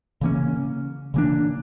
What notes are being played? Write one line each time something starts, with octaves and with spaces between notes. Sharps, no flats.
C#3 E3 A#3 C#4
C#3 E3 A#3 D4